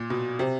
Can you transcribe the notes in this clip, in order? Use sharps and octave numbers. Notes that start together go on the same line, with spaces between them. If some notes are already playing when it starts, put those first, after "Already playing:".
Already playing: A#2
B2
C3